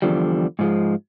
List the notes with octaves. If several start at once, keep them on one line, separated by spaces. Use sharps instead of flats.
E2 D3 F3 G3
G#2 F3 G#3